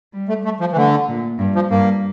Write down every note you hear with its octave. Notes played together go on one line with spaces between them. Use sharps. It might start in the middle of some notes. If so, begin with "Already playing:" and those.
G3
A3
A3
F3
E3
D3 A3
A#2
G2
F3
G2 A#3